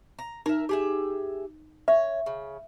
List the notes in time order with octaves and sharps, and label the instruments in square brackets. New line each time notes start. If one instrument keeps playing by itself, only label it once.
[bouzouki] A#5
[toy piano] D#4 [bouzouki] A#4 E5
[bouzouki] G4 G#4 E5
[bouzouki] C#5 [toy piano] E5
[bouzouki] C#3